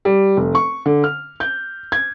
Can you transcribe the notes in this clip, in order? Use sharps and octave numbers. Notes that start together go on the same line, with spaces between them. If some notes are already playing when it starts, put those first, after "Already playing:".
G3
F1
C#6
D3
F6
G6
G#6